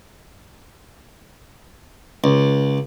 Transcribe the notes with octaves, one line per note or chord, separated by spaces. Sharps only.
C#2